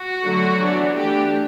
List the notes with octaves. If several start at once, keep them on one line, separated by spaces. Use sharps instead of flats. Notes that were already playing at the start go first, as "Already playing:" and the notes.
Already playing: F#4
D3 F#3 A3
E3 B3 D4
E3 A3 D4 G4